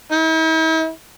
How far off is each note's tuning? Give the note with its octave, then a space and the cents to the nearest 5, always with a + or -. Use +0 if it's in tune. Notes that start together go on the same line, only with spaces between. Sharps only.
E4 -45